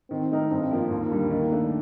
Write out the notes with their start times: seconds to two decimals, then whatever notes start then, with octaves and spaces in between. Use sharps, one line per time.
0.10 D#3 C4
0.31 A3 D#4 A#4
0.51 G2 C4
0.71 F3 A#3 F4
0.91 D#2 A#3
1.11 D3 G3
1.31 D#3
1.52 A3 D4